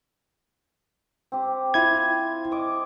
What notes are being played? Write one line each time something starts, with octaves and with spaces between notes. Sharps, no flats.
C4 G4
E4 F4 G#6
D#5 D6